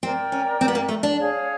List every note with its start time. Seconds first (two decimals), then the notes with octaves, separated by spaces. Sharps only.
0.03 C4 A#4 D5 G5
0.32 C#4
0.61 C4
0.68 B3
0.75 A#3
0.89 A3
1.03 D4
1.18 G#4 C#5 F5